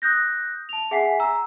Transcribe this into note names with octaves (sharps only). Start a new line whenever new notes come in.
D#6 F#6 G6 A#6
A5 F7
G#4 E5 F#5 G#5 B6 C7
A#5 E6